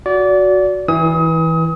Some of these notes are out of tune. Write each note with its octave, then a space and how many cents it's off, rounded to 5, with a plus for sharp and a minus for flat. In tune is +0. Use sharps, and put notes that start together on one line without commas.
F#4 -5 D5 -25
E3 -15 D#6 +35